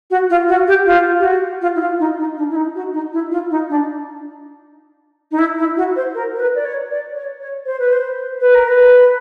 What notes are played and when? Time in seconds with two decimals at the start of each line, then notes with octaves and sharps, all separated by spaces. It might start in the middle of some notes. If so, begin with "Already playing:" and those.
0.10 F#4
0.30 F4
0.48 F#4
0.67 G4
0.86 F4
1.19 G4
1.24 F#4
1.61 F4
1.75 E4
1.80 F4
1.99 D#4
2.18 D#4
2.37 D4
2.49 E4
2.55 D#4
2.75 F#4
2.93 D#4
3.13 E4
3.31 F4
3.50 D#4
3.69 D4
5.31 D#4
5.38 E4
5.58 E4
5.77 F#4
5.96 C5
6.14 A#4
6.33 A#4
6.39 B4
6.55 D5
6.65 C#5
6.90 D5
7.15 C#5
7.40 C#5
7.65 C5
7.79 B4
7.92 C5
8.41 B4
8.54 A#4
8.68 B4